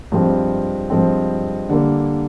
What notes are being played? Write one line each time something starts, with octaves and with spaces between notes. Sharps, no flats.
G2 F3 G#3 C4
G2 F3 G#3 C4
D3 G3 A#3